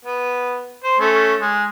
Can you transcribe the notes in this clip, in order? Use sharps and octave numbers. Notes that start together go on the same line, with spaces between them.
B3
C5
A3 C#4
G#3